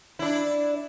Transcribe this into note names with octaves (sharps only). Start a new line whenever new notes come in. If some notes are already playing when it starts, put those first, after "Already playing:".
D4 E4